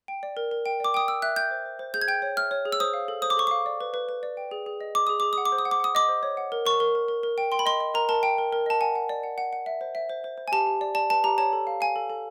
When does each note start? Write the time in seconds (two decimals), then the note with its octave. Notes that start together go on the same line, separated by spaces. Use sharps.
0.08 G5
0.23 D5
0.37 A#4
0.51 A#4
0.66 G5
0.80 D5 D6
0.94 G5 D#6
1.08 G5 E6
1.22 E5 F#6
1.36 G5 G6
1.51 C5
1.66 C5
1.79 C5
1.94 G#4 G6
2.02 G#6
2.08 G5 G6
2.22 C#5
2.37 E5 F6
2.51 C#5
2.66 G#4
2.72 E6
2.80 C5 D#6
2.94 F5
3.08 A4
3.22 C5 D#6
3.30 D6
3.37 A4 C#6
3.47 F5 D6
3.66 D5
3.81 B4
3.94 B4
4.09 B4
4.23 D5
4.37 G5
4.51 G#4
4.66 G#4
4.81 D#5
4.95 G#4 D6
5.07 G#4 D#6
5.20 G#4 D6
5.33 F#5 D#6
5.46 D6
5.52 C5
5.59 D#6
5.65 F#5
5.71 D6
5.80 F#5 D#6
5.95 D#5 D6
6.09 C5
6.23 C#5
6.37 F#5
6.52 A#4
6.65 A#4 C#6
6.80 A#4
6.95 A#4
7.08 A#4
7.23 A#4
7.38 G5
7.52 G5 C6
7.59 B5
7.66 D#5 C6
7.80 D#5
7.94 A#4 A#5
8.09 A#4 A5
8.23 A#4 G5
8.38 A#4
8.53 A#4
8.66 D#5 A5
8.81 F#5 G#5
8.96 F#5
9.09 D5
9.23 F#5
9.38 F#5
9.53 F#5
9.66 E5
9.81 C5
9.95 E5
10.10 C5
10.24 C5
10.38 C5
10.48 G#5
10.52 G4 A5
10.67 G4
10.81 D5
10.95 D5 A5
11.10 B4 A5
11.24 G4 A#5
11.38 C#5 A5
11.53 A4
11.67 F5
11.81 F5 G#5
11.96 A4
12.10 A4